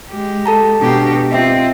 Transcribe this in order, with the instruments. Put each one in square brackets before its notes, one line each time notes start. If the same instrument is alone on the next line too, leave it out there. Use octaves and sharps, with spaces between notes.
[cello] G#3 G4
[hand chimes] A4 A5 A#5
[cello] B2 G4 [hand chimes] B3 D4
[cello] C4 F4 [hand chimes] D#5 E5 G5